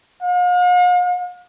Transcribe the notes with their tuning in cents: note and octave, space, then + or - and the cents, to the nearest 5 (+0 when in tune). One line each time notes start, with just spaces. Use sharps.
F5 +45